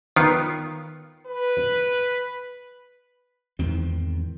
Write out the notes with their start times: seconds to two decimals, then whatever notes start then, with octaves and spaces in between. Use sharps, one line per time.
0.16 D#3 B3 F4
1.26 B4
3.59 E2 G#2 D#3 C4